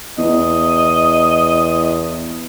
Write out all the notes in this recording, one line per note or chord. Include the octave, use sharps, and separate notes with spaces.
E2 D#5